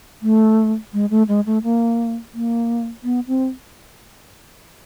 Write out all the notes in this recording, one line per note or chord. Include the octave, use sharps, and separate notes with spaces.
A3
G#3
A3
G#3
A3
A#3
A#3
B3
C4